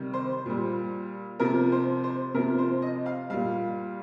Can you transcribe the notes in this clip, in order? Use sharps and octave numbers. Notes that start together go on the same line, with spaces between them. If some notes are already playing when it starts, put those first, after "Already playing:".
Already playing: C3 D#3 G3
C5
A#2 G3
C3 F3 A#4
C5
C5
C3 F3 A#4
C5
D#5
F5
A#2 G3 F5